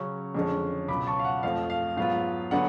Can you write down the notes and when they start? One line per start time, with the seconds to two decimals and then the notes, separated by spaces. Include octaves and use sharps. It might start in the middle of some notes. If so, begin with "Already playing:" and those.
Already playing: C#3 F#3 C#4
0.35 F2 D3 G#3 C#4
0.88 C#2 B2 F#3 B5 D6
1.07 A5 C#6
1.19 F5
1.25 F#5
1.43 F2 F3 A3 F5
1.70 F5
1.97 G#2 F#3 B3 F4 F5
2.51 D3 F#3 B3 F#5